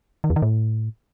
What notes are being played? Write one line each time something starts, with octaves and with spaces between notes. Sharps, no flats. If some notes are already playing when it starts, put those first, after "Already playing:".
D#3
E2
D#3
A2